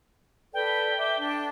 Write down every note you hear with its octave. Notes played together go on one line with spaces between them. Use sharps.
A4 B4 D5 G5
E5 D6
D4